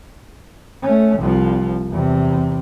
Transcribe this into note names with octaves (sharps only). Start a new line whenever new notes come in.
A3 C#4
C2 F3
E2 C3